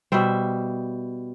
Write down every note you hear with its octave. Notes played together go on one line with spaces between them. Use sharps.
B2 G3 C5 E5